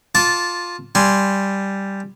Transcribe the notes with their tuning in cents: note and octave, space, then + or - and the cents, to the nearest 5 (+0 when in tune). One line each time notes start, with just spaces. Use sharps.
F4 +10 A5 -10 D6 -30
G3 +0 G#5 +5 C6 +0